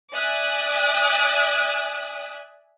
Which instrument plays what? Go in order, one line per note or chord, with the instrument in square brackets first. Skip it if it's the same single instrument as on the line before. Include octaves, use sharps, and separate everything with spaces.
[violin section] D5 E5 G#5 D#6 F#6